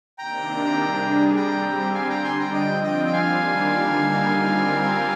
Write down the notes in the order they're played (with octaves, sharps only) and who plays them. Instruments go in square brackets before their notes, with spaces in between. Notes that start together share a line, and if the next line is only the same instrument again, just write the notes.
[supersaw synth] C3 D#3 A#3 D4 [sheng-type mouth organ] G5 A#5
[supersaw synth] G3 D4 G#4
[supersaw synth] G3 C4 G4 [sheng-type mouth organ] G5 A#5
[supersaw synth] D3 G3 D4 [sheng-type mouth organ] F5 G#5
[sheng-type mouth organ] G5 A#5
G#5 C6
G5 A#5
[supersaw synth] F3 C4 F4 [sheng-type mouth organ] D#5 G5
[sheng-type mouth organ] D#5 G5
G5
[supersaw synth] D#3 G3 A#3 D4 F4 [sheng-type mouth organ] F5 G#5
[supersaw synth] D3 G3 A#3 D#4
G3 C4 F4 A#4